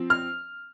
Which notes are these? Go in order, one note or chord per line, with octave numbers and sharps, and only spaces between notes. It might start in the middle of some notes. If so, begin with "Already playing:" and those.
Already playing: F3 C4
F6